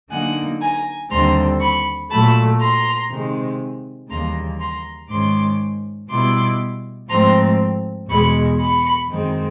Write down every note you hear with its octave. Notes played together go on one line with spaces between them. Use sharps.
D3 F#3 A#3 D#4 F#5 G#5
G#5 A#5
D#2 D3 G3 C4 A#5 C6
B5 C#6
A#2 F#3 A3 A5 B5
A#5 C6
C3 D#3 G#3
D#2 C#3 E3 G3 A#3 A#5 C6
A#5 C6
G#2 D#3 G#3 C#4 C6 D6
B2 G3 B3 E4 C6 D6
G#2 F3 A3 C4 A#5 C6
E2 B2 G#3 B5 C#6
B5 C#6
F#2 D#3 G#3 C4 D#4